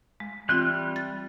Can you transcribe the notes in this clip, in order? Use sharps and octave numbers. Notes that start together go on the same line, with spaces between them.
G#3
E3 G3 C4 F4 F#6
A6